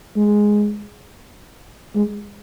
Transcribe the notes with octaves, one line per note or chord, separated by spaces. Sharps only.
G#3
G#3